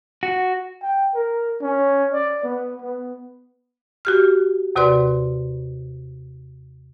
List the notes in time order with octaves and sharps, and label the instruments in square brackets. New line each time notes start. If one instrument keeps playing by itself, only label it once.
[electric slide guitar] F#4
[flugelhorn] G5
A#4
C#4
D5
B3
B3
[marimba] F#4 G4 F6
D#2 C3 F#4 B4 D5 C6